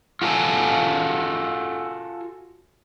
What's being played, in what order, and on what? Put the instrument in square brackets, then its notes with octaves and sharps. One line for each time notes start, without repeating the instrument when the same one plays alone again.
[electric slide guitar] F4 F#4 A4 C#5 G#5